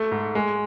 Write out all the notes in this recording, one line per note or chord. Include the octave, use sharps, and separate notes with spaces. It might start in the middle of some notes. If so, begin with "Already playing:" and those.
Already playing: A3
G#2
G#3